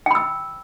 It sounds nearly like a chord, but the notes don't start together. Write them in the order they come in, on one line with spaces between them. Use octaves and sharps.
G5 B5 E6